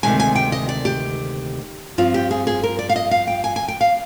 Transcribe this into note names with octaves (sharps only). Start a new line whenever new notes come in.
D2 C3 D#3 G#3 G#5
G#5
G5
D#5
D5
G4
G2 F3 C4 F4
G4
G#4
G#4
A#4
D5
F5
D#5
F5
G5
G#5
G#5
G5
F5